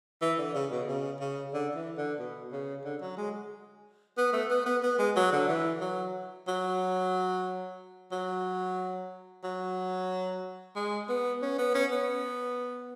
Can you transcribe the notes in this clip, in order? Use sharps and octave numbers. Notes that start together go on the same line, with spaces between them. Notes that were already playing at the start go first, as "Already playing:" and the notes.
E3
D3
C#3
B2
C#3
C#3
D3
E3
D3
B2
C#3
D3
F#3
G#3
B3
A3
B3
B3
B3
G#3
F#3
D3
E3
F#3
F#3
F#3
F#3
G#3
B3
C#4
B3
C#4
B3